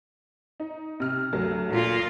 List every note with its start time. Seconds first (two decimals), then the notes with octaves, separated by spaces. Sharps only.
0.60 D#4
1.00 C3 F6
1.33 D2 F#3 A3
1.70 A#2 F4